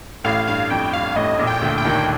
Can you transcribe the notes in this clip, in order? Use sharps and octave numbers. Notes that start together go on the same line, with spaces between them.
A1 A2 F5
G2 F5
F2 G5
G2 F5
A1 A2 D#5
A#1 A#2
G5
D2 D3
G5
D#2 D#3